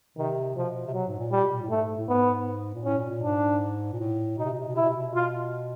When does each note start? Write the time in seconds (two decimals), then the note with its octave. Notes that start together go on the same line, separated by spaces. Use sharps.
0.18 C3 D#3
0.56 B2 F3
0.87 C3
0.94 B2 F#3
1.07 G#2
1.19 A#2
1.32 G3
1.44 B2
1.53 A#2
1.62 A2
1.70 G#2 A3
1.98 A2
2.08 G#2 B3
2.75 A#2
2.85 A2 C#4
2.98 A#2
3.11 A#2
3.23 G#2 D4
3.93 A#2
4.00 A2
4.38 B2 D#4
4.46 C3
4.53 B2
4.60 C3
4.68 B2
4.75 C3 E4
4.82 B2
4.89 C3
4.97 B2
5.14 B2 F4